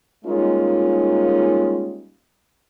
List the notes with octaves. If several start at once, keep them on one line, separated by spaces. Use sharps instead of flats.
G3 G#3 A#3 C#4 D#4 F4